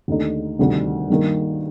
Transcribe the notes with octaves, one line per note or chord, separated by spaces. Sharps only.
D#2 D3 A3 D#4
D2 C3 D#3 G3
G2 D#3 A#3